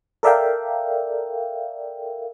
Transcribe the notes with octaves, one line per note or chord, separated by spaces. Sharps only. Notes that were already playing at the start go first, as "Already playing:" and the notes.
A4 A#4 D5 E5 F5 G5